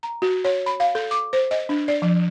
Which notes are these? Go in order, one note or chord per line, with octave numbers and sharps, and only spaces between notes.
A#5
F#4
C#5
B5
F5
A4
D6
C5
D#5
D4
D5
F3